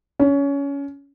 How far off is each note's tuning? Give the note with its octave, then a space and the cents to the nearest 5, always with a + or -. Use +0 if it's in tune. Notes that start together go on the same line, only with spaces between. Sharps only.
C#4 +20